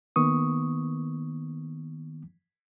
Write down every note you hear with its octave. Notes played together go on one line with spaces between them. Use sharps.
D#3 A#3 B3 C#6 D#6